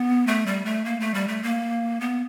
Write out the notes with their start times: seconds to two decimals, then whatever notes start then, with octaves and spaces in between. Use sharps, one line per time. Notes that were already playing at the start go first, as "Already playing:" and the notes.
Already playing: B3
0.27 A3
0.46 G3
0.65 A3
0.85 A#3
1.00 A3
1.14 G3
1.28 A3
1.43 A#3
2.01 B3